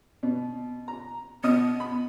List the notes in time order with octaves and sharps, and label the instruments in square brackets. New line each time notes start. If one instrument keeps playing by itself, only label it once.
[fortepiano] B2
A#5
[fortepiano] B2 D#5 D#6 [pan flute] B3
[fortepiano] B5